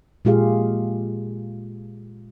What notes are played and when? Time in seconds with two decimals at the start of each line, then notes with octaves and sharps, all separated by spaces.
0.25 A#2 G#3 F4 G4 G#4 F5